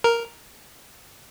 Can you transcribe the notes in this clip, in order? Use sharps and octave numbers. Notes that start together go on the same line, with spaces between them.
A#4